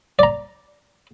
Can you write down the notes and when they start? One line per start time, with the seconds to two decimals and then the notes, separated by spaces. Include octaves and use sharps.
0.19 D5 A#5